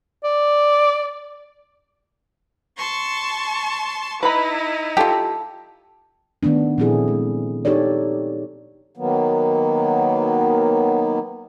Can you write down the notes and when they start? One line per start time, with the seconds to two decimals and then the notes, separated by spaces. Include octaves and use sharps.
0.24 D5
2.77 A5 C6 C#6
4.23 D#4 E4 B4 A#5 B5
4.97 F4 G4 A4
6.43 D#3 A3 B3 D4
6.78 A#2 F3 C4 E4 G#4 A4
7.08 G#3
7.65 D#4 G4 A4 C#5 D5
8.97 D#3 F#3 A#3 B3